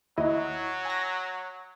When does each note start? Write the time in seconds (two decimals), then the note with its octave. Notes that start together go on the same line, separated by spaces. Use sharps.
0.18 D#2 F#3 E4 D#5
0.85 G#5 A#6